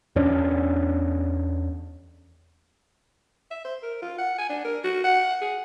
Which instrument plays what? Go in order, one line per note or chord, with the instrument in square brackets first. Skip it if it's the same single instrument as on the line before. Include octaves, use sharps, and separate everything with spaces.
[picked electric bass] E2 C#4 D4
[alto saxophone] E5
C5
A#4
F4
F#5
G#5
D4
A#4
F#4
F#5
G#4